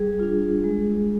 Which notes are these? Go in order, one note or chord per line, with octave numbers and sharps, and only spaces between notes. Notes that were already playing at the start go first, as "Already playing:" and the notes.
Already playing: G3 G#4
D4 F4
G#3